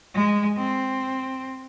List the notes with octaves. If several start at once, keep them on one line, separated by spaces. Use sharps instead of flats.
G#3
C4